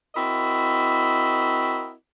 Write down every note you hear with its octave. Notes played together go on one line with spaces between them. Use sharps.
C4 E4 F#4 A#4 D#5